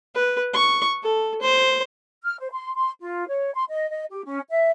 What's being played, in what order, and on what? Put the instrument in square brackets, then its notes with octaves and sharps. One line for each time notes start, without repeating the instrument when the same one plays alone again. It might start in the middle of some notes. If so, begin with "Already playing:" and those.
[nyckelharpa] B4
C#6
A4
C5
[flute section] F6
C5
C6
C6
F4
C#5
C6
D#5
D#5
G4
C#4
E5